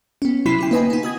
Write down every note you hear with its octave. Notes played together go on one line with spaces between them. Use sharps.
B3 C#4
C3 F#3 E4 B5 B6 C7
D3 E4 G5
A#3 D#4 B4 D#5 G5 G#5
B3 D#4
F#4 D#6 G#6